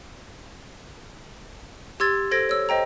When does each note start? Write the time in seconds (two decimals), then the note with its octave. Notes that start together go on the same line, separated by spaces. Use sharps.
2.00 G4 C6 E6 G#6 A6
2.31 A4 C5 G#6 A#6 D7
2.49 C#5 E6
2.69 C5 D#5 G5 A#5